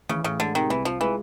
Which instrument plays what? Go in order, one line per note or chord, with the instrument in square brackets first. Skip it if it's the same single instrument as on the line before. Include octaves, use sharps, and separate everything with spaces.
[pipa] C#3 [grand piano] E3
[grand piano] A2 [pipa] C#3
[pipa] D3 [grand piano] G#3
[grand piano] C3 [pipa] D#3
[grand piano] C2 [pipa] E3
[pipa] F3 [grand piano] F4
[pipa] E3 [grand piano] G#3